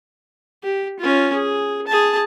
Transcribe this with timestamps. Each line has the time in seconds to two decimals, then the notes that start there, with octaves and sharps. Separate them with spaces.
0.63 G4
1.00 C#4 F4
1.34 G#4
1.87 G#4 A5